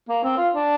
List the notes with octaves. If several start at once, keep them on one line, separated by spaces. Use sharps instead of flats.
A#3
C4
F4
D4